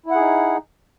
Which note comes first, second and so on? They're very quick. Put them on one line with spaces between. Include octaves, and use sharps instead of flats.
E4 F#5 G#4 D#4